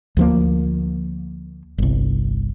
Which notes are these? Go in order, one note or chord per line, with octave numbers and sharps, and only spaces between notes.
D2 F3 A#3
G1 C2